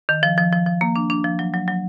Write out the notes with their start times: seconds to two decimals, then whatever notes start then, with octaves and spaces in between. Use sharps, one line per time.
0.09 D#3
0.23 F3
0.38 F3
0.53 F3
0.66 F3
0.81 A#3
0.96 D4
1.10 D4
1.24 F3
1.39 F#3
1.54 F#3
1.68 F#3